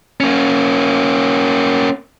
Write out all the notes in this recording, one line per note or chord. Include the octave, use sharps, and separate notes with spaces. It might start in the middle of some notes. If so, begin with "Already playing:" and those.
A#3 C#4